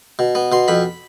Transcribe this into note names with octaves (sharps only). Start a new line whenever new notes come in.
B2
B3
B2 C6
F2 B5